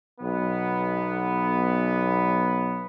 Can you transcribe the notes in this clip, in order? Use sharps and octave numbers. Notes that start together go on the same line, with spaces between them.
B1 B3